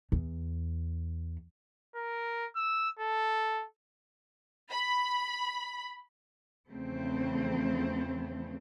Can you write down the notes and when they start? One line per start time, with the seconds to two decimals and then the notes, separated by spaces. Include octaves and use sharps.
0.12 E2
1.96 A#4
2.56 E6
2.99 A4
4.72 B5
6.69 E2 C#3 F3 A3 C4